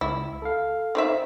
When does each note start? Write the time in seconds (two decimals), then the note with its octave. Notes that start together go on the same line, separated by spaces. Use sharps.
0.01 C#2 E4
0.42 A4 F5
0.95 D#3 C4 E5